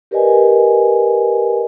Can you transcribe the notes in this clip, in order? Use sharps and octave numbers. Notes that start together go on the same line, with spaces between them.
G4 A#4 B4 D5 D#5 G#5